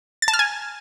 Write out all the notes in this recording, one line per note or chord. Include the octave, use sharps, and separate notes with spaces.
A6
A5
F6
G#5